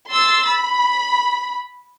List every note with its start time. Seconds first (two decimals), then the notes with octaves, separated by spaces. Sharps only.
0.12 C6 E6 A6
0.50 B5